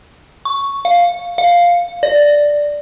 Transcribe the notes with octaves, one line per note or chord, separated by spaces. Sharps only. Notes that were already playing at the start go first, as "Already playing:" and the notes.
C#6
F5
F5
D5